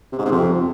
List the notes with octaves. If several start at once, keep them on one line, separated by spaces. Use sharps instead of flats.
C3
G#2
C3
F2